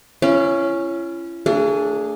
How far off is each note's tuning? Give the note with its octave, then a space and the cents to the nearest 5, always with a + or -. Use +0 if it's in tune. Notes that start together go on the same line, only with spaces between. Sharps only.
C#4 +0 E4 +45
A3 +45 D4 +0 G#4 +0